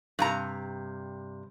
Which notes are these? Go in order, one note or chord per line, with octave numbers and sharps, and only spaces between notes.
G2 C3 A#5